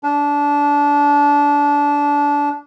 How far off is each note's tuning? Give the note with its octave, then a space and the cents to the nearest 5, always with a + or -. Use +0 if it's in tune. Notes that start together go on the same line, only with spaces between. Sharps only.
D4 -20